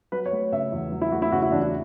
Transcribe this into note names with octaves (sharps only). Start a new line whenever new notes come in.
F#3 B4
C#5
A3
C#3 E5
E2
F#3
E4
A3 F#4
E4
C#3 F#4
E4
E2 D4
E4